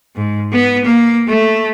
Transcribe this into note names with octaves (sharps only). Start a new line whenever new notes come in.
G#2
B3
A#3
A3